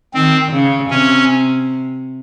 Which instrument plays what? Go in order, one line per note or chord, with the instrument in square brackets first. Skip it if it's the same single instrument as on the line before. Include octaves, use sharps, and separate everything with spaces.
[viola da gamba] D#3 [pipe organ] C4
[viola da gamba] C#3
[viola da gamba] C3 [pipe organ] C#4